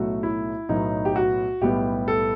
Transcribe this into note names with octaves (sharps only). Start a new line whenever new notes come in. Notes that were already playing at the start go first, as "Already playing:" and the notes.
Already playing: B1 A2 F#3 A3 F#4
E4
B1 A2 F#3 B3 D#4
G4
F#4
B1 A2 G3 B3 G4
A4